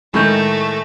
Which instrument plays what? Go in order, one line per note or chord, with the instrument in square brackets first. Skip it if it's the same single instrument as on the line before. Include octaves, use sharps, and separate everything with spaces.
[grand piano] A2 D#3 G6 [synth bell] G#3 C#6 A#6 [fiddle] A3